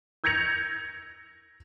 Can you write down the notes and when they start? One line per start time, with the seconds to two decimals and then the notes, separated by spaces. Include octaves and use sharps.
0.24 E6 G6 G#6 A#6 C#7 F7